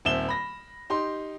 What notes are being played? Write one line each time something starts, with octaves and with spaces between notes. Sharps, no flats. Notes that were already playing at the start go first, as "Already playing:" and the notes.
D#1 C4 E5 E7 G7
B5 A#6
D#4 G4 C6